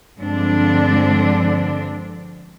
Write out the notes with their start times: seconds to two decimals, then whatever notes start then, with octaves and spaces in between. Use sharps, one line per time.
0.19 G2 D3 F3 G#3 C4 D4